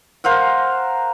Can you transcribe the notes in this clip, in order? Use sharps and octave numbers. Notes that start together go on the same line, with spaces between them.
A#4 C5 F5 F#5